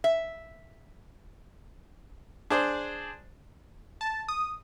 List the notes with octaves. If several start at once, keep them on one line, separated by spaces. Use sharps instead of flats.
E5
D4 G#4 C5 D5
A5
D#6